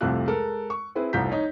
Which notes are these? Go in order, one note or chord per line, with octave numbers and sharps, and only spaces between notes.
C2 F2 C3 A3 F4 F#6
G#3 A4 A#4
C#6
C4 E4 G#4 B4
F1 C2 F3 A#5 G6 B6
D#4 C#5 D#5